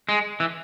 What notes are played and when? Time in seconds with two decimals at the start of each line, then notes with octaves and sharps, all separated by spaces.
0.09 G#3
0.40 E3